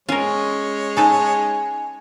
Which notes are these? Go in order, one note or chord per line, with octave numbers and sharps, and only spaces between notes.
G#3 C#4 F4 A#4 C#5
D#4 A4 B4 G#5